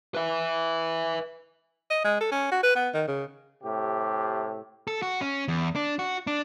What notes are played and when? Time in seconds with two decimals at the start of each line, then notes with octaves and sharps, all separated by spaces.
0.15 B4 E5
1.90 D#5
2.04 G#3
2.20 A4
2.32 C#4
2.51 F#4
2.63 B4
2.76 B3
2.94 D#3
3.08 C#3
3.63 A2 C3 G4
4.87 A4
5.02 F#4
5.21 C#4
5.48 E2
5.76 D4
5.99 F#4
6.27 D4